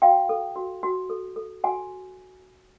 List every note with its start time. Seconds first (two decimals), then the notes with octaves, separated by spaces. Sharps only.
0.02 F#4 F5 G5
0.29 A4
0.56 F#4
0.83 F#4
1.10 A4
1.36 A4
1.64 F#4 F#5 G#5